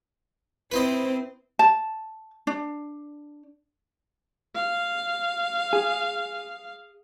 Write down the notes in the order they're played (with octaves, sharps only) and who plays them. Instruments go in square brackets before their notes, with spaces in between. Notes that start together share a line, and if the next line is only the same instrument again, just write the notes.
[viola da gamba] C4 E4 [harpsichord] B4 C5 D#5
[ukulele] A5
D4
[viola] F5
[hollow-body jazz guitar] G#4